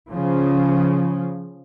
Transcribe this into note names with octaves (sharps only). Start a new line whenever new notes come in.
C#3 F3